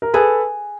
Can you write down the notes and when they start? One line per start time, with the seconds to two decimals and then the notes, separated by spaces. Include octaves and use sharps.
0.02 A#4
0.14 G#4 A4 B4